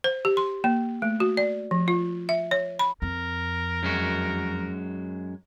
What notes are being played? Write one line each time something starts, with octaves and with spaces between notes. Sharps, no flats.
C5
G4
C6
A#3
A3
F#4
D5
F3
F4
E5
C#5
B5
F2 A#4
F#2 G#3 F#4